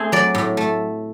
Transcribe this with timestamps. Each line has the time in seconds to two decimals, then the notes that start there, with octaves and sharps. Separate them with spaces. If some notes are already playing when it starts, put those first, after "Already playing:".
Already playing: A3 C4 G#4
0.12 F#3 D5
0.35 A2
0.57 A3